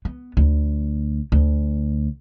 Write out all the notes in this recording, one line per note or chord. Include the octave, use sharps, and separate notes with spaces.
B3
D2
D2